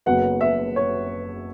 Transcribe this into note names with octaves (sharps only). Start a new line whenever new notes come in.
F#1 F#2 F#3 B3 F#5
E5
C#5